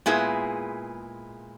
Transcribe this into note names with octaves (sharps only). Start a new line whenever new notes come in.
A#2 G#3 B3 E4 G#4